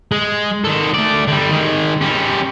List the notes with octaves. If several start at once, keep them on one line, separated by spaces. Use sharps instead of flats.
G#3
D#3 A4
A3 D5
D3 G3
D#3 G#3
G3 C#4